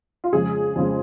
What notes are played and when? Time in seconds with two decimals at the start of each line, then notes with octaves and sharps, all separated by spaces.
0.24 F4
0.33 F2 C#3 F3 G#3 G#4
0.76 F2 C#3 F3 G#3 F4